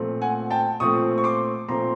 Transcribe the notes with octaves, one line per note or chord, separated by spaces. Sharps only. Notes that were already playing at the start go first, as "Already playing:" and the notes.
Already playing: A#2 F3 A3 C4
F#5 G#5
G5 A5
A#2 F3 A3 C4 C#6 D#6
C#6
C6 D6
A#2 F3 A3 C4 A#5 C6